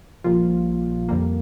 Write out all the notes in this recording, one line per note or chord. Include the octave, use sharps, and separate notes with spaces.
A#1 A#2 F3 G3 A#3 F4
F2 D3 G3 A#3